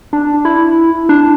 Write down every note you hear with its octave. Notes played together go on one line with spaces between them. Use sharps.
D4
E4
D4